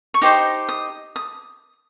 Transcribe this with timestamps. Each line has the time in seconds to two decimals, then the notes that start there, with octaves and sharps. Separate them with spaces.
0.14 C#6
0.21 D#4 G4 C5 D#5 D6
0.69 D#6
1.16 D#6